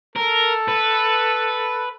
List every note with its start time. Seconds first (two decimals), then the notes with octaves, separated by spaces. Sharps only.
0.16 A4 A#4
0.68 B4